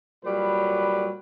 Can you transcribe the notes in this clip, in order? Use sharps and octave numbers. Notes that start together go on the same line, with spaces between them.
A#2 F#3 G3 B4